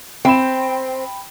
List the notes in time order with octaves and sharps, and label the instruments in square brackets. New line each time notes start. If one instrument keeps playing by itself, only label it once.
[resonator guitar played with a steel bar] C4 [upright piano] G5 B5 E7